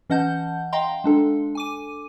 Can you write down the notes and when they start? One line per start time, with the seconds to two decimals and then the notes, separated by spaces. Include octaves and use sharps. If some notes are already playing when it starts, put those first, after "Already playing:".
0.10 E3 C#4 D#5 F#5 A5 G6
0.72 D#5 F5 G5 A#5 C6
1.04 G#3 D4 A4
1.55 G#5 D6 D#7